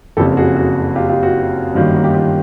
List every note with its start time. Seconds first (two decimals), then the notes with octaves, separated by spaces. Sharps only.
0.17 F#1 F2 C#3 G4 A4
0.37 F#4 G#4
0.56 F#4
0.95 F4 G4
1.09 F4 G4
1.23 F#4
1.74 G1 F#2 D#3 G3 A#3 F4
1.95 F#4
2.04 F4 G4
2.14 F4 G4